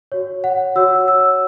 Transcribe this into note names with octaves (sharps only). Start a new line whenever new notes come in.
F#4 C#5
F#5
F#4 C#5 E6
E6